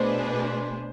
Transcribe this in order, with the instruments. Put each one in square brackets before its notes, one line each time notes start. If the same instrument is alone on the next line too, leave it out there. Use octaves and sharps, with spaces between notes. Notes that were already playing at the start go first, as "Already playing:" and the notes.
Already playing: [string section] B2 A3 D4 G#4 B4 [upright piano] C5